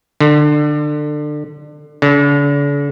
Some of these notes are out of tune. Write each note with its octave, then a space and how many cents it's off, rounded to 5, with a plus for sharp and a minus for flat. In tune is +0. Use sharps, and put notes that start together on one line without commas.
D3 +25
D3 -40